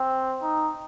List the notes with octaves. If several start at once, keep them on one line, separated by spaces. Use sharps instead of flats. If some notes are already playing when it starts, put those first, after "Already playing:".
Already playing: C4
D#4